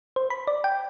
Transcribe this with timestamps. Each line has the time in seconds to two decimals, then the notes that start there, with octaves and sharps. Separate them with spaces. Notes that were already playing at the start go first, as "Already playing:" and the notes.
0.16 C5
0.30 B5
0.47 D5
0.64 G5